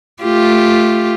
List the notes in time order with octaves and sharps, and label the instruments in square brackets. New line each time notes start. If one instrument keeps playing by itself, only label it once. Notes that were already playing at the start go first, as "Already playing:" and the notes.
[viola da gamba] A3 F4 G4